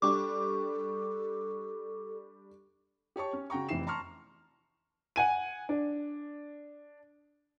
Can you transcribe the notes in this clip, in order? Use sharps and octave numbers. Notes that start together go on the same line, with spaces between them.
G3 D4 G4 A4 C#6 D6
G4 C#5 A5 C#6
C#4
C#3 F#4 G5 A#5 C#6
F1 E3 C4 C7 E7
A5 A#5 C6 C#6 F6
F#5 G#5 D#7
D4